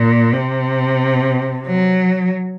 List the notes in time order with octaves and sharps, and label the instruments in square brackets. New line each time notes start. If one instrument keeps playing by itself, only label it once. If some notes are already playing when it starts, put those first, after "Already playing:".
Already playing: [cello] A#2
C3
F#3